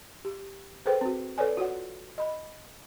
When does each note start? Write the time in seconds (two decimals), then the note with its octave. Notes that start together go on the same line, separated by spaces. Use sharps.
0.25 G4
0.86 G#4 A4 B4 C5 G5
1.01 C4 F#4
1.38 A4 B4 C#5 D5 G#5
1.57 F4 F#4 C#5 F#5
2.18 D#5 B5